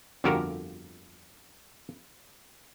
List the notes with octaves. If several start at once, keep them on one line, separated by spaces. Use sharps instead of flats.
G1 F2 D3 F#4 G4 A#4